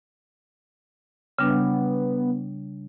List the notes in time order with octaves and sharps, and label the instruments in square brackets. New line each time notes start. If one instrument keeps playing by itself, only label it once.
[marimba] C#3 G3 D4 [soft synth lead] B3